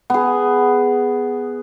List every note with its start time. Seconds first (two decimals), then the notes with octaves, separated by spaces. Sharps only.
0.10 B3 G#4